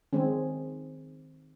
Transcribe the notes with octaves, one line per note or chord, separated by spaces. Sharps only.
D#3 G#3 C4 C#4